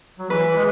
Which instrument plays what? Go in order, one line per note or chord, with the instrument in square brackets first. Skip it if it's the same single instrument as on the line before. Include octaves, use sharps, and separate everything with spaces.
[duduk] F#3
[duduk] E3 [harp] B4
[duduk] G#3